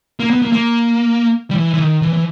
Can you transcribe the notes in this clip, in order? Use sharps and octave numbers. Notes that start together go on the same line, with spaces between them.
A#3
B3
A#3
A#3
G3
E3
E3
D#3
E3
E3